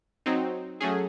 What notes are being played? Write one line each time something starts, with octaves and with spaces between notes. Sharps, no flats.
F#3 C4 D#4
F#3 A3 C#4 G#4